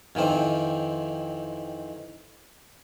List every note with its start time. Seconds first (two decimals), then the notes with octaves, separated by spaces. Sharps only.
0.15 F2 D#3 E3 C4